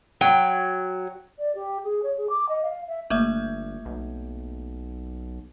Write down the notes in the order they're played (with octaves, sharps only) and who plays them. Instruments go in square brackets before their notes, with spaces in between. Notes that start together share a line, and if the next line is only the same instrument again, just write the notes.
[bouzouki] F#3 [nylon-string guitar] G5
[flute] D5
G4
G#4
C#5
G#4
D6
D#5
F5
E5
[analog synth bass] G1 [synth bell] A3 A#3 E5
[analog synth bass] B1